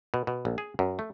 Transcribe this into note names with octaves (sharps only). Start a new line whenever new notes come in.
B2
B2
A#1
G#4
F#2
A3